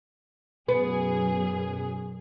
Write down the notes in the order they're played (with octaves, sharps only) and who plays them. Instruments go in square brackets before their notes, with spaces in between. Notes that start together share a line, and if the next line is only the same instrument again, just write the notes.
[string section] F#2 B2 G#4 [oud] B3